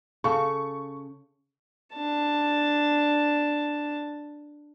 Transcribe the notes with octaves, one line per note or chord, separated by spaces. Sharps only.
C#3 A4 C#6
D4 A5